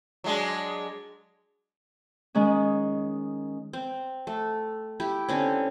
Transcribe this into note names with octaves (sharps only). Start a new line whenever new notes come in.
F#3 G#3 D4
D#3 G#3 C#4
C4
A3
E4 G4
D3 C4 C#4